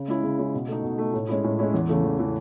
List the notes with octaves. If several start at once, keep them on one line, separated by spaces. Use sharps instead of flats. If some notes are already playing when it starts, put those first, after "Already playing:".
Already playing: C#3
G#3 C#4 E4
C#3
G#3 C#4 E4
B2
A3 D#4
B2
A3 D#4
A2
G#3 C#4 E4
A2
G#3 C#4 E4
E2
C#3 E3 A3
E2
C#3 E3 A3